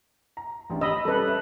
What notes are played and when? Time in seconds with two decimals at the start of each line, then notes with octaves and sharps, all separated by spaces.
0.37 A#5
0.70 A1 D4 G4
0.81 D#5 B5 E6
1.05 G3 C#4 A4 B4
1.27 E5